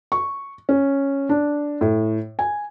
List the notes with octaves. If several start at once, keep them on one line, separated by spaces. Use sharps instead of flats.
C#6
C#4
D4
A2
G#5